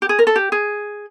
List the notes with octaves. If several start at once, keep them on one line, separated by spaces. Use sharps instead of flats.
G4
G#4
A#4
A4
G4
G#4